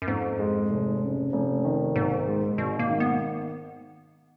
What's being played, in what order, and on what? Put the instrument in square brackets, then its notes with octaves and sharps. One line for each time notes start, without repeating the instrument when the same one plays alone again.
[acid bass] F#2
[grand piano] F2 [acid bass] G#2
[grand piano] G#3
F1
C#3
F1
D#3
[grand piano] B1 [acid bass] G#2
[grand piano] G#3
[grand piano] G#1 [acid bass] B2
[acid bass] A#3
[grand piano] D#3
[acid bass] B3